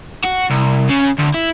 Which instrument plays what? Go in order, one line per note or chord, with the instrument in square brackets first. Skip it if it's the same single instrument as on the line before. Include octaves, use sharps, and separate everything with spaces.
[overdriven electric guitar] F#4
C2
C#3
D2
E4